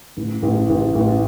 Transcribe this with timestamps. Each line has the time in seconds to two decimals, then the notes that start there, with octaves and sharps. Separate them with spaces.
0.17 A1
0.43 A1
0.70 A1
0.95 A1